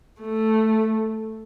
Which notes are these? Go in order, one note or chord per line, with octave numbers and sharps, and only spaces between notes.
A3